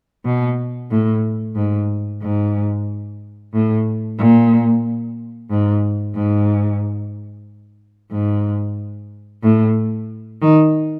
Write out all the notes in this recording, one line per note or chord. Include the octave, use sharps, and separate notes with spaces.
B2
A2
G#2
G#2
A2
A#2
G#2
G#2
G#2
A2
D#3